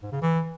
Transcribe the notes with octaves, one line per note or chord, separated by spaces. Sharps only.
G#2
C#3
E3